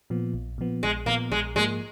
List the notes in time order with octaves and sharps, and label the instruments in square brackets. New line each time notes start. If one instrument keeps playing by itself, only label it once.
[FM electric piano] A#2 F3 B3
A#1
A#2 F3 B3
[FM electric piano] A#1 [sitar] G#3
[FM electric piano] A#2 F3 B3 [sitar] A#3
[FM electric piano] A#1 [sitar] G#3
[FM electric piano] G#2 F3 A#3 [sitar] G#3